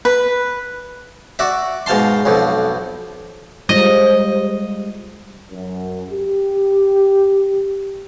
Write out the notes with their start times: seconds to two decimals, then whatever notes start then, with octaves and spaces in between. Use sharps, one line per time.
0.05 B4
1.39 F#4 D5 E5
1.86 G#2 B2 F5 A5 C6
2.25 B1 F2 B2
3.69 G3 G#3 F4 C5 D#5
5.50 F#2
6.10 G4